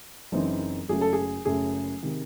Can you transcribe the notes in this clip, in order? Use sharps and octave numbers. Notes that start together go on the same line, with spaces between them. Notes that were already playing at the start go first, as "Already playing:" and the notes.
F#1 F#2 E3 C4 D#4
F#1 F#2 C#3 F#3 A3 G#4
A4
G#4
F#1 F#2 C#3 F#3 A3 G#4
C3 D#3